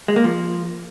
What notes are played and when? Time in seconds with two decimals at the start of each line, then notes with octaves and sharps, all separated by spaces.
0.08 G#3
0.16 A#3
0.24 F3